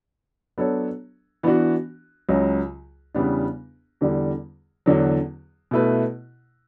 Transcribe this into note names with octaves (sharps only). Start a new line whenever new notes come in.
F#3 B3 D4 A4 C#5
E3 B3 D4 F#4
C#2 C#3 F#3
E2 C#3 G3 B3 D4
E2 D3 G3
E2 D3 F#3
B2 A3 E4 B4